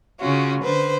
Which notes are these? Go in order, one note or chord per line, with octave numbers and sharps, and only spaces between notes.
C#3 C#4 F4 F#4
D3 B4 C5